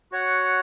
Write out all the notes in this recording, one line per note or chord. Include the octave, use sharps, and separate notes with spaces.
F#4 C#5 F#5